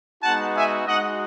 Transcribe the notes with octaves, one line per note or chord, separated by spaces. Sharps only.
G#3 B3 D#4 F#4 F#5 A5
E5 G#5
G#3 D#4 F#4 D#5 F#5